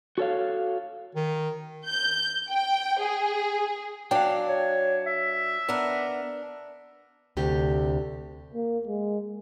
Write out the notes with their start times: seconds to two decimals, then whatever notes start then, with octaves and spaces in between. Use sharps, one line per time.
0.18 F#4 A4 C#5 F5
1.15 D#3
1.85 G6
2.49 G5
3.00 G#4
4.11 F#3 D4 F5 G5
4.48 C#5
5.06 E5
5.69 B3 D4 A#4
7.37 D2 C3 G4
8.54 A#3
8.87 G#3